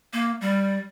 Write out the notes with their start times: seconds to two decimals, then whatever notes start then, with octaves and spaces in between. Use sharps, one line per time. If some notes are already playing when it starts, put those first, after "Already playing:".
0.13 A#3
0.41 G3